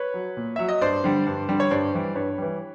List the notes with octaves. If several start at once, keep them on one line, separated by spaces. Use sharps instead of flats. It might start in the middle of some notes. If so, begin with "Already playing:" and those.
Already playing: B4 C#5
F#3
A#2
F#3 E5
D#5
G2 C5 D5
D3 G3
G2
D3 G3
C#5
G2 C5 D5
E3 G3
G2 B4 C#5
E3 G3